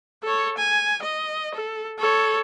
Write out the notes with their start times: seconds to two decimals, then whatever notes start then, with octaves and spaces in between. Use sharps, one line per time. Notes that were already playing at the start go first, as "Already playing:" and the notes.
0.23 A4 C#5
0.58 G#5
1.02 D#5
1.54 A4
1.98 A4 C#5